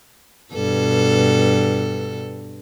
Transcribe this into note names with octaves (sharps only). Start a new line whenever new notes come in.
G2 B2 A4